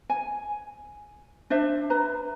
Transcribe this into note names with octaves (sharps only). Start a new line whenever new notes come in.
G#5
D4 C5 E5
B4 A#5